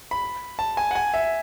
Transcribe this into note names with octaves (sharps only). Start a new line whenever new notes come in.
B5
A5
G#5
F#5
G#5
E5